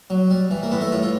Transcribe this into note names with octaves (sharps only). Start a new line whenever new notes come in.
F#3
G3
E3
A#3
A2 B3
E4
A2 F4
F4